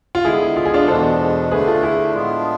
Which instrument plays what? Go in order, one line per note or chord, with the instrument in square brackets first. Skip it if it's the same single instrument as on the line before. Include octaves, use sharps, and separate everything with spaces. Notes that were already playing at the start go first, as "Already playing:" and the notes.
[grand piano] F4
[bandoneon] D3 G#3 B3 [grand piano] E4 G#4
[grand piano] F4
G#4
D4 F4
[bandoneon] E2 B2 G#3 D4 [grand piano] A4 C5
[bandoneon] D3 A3 D4 [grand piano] G#4 B4
[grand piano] F4 A4
E4 G#4
[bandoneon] A2 G#3 B3 D4 F4